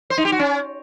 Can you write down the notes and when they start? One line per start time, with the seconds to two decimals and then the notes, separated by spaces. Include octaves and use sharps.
0.10 C5
0.18 D#4
0.25 G4
0.32 F#4
0.39 C#4